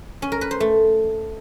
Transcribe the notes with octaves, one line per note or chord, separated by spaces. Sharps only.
C#4
A#4
B4
C5
A3